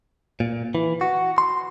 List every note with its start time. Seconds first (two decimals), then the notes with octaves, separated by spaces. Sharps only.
0.40 A#2
0.75 E3
1.01 F#4
1.38 C6